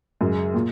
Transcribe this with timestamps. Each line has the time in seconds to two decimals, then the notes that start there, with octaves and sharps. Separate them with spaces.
0.21 F#2 C#3 G#3
0.54 A#2